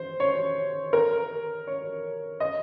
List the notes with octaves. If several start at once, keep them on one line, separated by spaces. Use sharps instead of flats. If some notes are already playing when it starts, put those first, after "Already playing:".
Already playing: C5
C#5
A#4
C#5
D#5